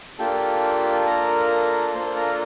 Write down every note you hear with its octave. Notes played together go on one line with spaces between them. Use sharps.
A#3 D4 F4 G4 A4 G5
A#4 A#5
A#3 D4 F4 A4 C5 C6
A#4 A#5